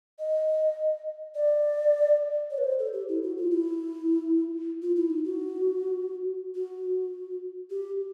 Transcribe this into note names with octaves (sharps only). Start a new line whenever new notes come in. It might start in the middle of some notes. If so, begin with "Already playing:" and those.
D#5
D5
C#5
B4
C5
A4
G4
E4
F#4
F4
E4
F4
E4
D#4
F#4
F#4
G4